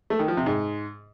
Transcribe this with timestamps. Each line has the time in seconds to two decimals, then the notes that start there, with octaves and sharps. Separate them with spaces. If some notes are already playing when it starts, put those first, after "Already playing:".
0.10 A3
0.19 D#3
0.28 F3
0.37 C3
0.46 G#2